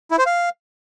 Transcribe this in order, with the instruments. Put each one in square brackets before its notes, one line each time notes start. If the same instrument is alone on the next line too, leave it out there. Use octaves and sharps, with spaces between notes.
[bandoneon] E4
C5
F5